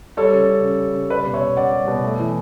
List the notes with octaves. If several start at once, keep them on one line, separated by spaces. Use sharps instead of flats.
G3 A4 C#5
C#3
C#3
C#4
G3
C#3
G3 B4 D5
B2
C#5 E5
B2
C#4 D5 F#5
G3
B2
A3
E3